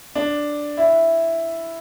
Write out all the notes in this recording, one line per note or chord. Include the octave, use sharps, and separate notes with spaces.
D4
E4